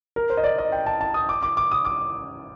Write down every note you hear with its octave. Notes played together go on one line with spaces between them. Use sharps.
A#4
C5
D#5
D5
D#5
G5
A5
A5
D#6
D6
D6
D6
D#6
D6